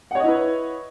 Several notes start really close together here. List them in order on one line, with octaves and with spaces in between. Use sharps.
F#5 C#5 D#5 E4 B4